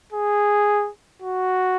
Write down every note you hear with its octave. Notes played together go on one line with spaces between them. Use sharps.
G#4
F#4